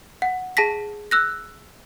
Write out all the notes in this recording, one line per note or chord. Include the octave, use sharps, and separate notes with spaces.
F#5
G#4 A5 A#6 B6
E6 F#6 A#6